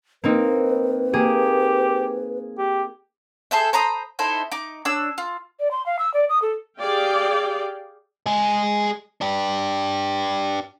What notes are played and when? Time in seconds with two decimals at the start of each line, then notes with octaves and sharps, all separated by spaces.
0.24 A#3 C4 D#4 B4
1.13 A#3 G4 G#4
2.58 G4
3.51 G#4 A4 C5 E5
3.73 C5 A#5 B5 D#6
4.19 D#4 E4 A4 C5
4.52 D#4 D6
4.85 D4 C#5 E6
5.18 F4
5.60 D5
5.71 C6
5.86 F5
5.99 E6
6.14 D5
6.29 D#6
6.42 A4
6.78 G4 G#4 D5 F5 G5
8.26 G#3 G#4
9.21 D4 G4